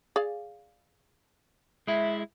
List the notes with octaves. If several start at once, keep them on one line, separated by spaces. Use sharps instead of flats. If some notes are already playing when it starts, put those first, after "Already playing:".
G#4 D5 F5
G#3 E4 E5